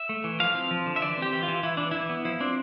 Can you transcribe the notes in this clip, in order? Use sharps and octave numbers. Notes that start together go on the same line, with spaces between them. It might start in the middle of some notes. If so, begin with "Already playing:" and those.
Already playing: E5
A3
E3
F3 F5
C4
F3
D3
E5
E3 D5
C4 G4
E3
F4
E3
E3 E4
E3 D4
E3 E4
B3
F3 E4
C4 D4